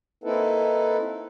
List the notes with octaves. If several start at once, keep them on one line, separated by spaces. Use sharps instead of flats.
A#3 C4 D#4 E4 A4 B4